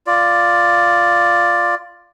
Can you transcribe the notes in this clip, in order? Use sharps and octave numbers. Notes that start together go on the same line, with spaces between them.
F4 D5